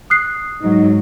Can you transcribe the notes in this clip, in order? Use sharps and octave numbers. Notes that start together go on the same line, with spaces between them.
D#6 F#6 C7
G#2 F#3 D#4